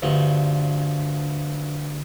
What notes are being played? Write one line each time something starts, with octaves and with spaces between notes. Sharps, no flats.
D2 G2 F3